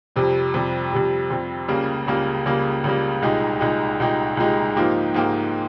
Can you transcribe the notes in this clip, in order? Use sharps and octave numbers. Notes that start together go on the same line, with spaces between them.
F2 C3 G3
F2 C3 G3
F2 C3 G3
F2 C3 G3
C#2 C#3 G3 A#3
C#2 C#3 G3 A#3
C#2 C#3 G3 A#3
C#2 C#3 G3 A#3
C2 A#2 G#3 D#4 G4
C2 A#2 G#3 D#4 G4
C2 A#2 G#3 D#4 G4
C2 A#2 G#3 D#4 G4
G#2 F3 A#3 D#4 G4
G#2 F3 A#3 D#4 G4